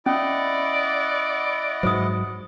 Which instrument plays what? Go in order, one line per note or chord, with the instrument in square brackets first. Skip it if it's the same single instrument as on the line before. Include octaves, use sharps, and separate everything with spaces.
[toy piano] C#4 [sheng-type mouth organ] E4 D#5 F#5 [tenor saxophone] D5
[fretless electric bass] G#2 F#3 [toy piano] C5 D#6